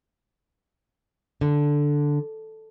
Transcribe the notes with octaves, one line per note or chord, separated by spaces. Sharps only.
D3